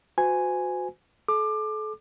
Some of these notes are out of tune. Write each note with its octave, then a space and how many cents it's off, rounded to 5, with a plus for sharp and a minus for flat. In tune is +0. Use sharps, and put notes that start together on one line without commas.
F#4 -25 C5 -45 G#5 +0
A4 -35 D6 +25